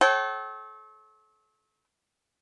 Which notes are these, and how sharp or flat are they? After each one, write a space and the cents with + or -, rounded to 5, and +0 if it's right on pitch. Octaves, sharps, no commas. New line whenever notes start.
A4 -35 C#5 -40 G5 -40